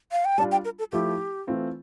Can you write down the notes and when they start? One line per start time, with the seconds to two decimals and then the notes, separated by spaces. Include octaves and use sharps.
0.12 F5
0.25 G5
0.38 G3 D4 F4 A5
0.52 G5
0.65 A#4
0.79 A4
0.92 F3 A3 E4 G4
1.47 E3 A3 C4 F4